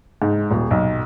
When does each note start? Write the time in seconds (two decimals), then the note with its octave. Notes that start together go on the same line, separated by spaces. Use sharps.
0.22 G#2
0.51 D#1
0.71 B1